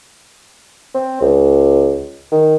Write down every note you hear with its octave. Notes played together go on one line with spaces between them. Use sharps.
C4
C#2
D#3